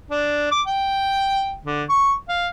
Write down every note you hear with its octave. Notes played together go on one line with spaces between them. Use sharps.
D4
D6
G5
D3
C#6
F5